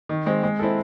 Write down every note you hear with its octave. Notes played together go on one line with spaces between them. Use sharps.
D#3
G#3 C4
G#3
C4 E4 A4